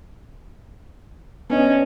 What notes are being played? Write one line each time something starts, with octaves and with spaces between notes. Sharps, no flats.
B3 C#4 D4 D#5